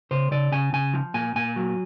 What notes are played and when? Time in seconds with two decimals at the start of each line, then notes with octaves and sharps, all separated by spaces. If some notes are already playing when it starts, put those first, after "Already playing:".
0.11 C#3 C5
0.31 C#3 D5
0.52 C#3 G#5
0.73 C#3 G#5
0.94 F3
1.14 A#2 G#5
1.36 A#2 G#5
1.56 F#3